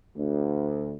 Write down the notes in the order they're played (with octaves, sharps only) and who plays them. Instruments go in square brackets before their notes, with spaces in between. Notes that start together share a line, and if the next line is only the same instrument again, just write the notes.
[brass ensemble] D2